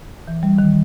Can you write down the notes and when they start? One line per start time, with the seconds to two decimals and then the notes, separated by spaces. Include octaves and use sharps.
0.27 E3
0.43 G3
0.58 D#3